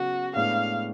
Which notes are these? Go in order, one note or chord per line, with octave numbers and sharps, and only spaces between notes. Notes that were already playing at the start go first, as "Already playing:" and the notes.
Already playing: C#3 F#3 B3 F#4
A2 G#3 B3 D4 F5